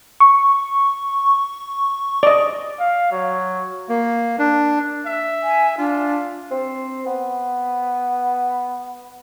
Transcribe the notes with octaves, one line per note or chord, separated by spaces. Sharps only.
C#6
D5 D#5
F5
F#3
A#3
D4
E5
G#5
D4 F4
C4
B3